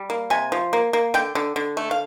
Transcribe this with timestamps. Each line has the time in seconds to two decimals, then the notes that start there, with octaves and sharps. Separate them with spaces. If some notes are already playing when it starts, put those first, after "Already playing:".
Already playing: G3
0.10 A#3
0.30 C3 G#5
0.52 F3
0.73 A#3
0.93 A#3
1.14 D3 G5
1.35 D3
1.56 D3
1.77 A3
1.91 F5